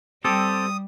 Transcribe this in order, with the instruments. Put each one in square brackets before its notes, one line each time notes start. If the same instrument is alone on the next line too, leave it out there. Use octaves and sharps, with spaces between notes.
[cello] G3 [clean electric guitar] C4 G4 A4 [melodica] D#6